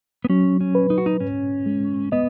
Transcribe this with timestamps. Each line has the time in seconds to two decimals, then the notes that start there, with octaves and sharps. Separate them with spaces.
0.25 B3
0.30 F#3 C#4
0.61 C#4
0.75 B4
0.90 D#4
0.98 F#4
1.06 D#4
1.20 G#2 C#4
1.66 G#3
2.12 B3 D#5